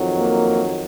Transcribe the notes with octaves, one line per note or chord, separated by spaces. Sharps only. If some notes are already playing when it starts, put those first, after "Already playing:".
Already playing: F2 D#3 F#3
A#3